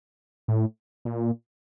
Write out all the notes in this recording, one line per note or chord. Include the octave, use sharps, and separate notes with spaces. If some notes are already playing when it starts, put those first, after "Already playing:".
A2
A#2